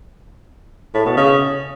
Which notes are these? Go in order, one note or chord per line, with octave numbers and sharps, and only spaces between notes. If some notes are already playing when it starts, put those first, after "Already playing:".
A2
B2
C#3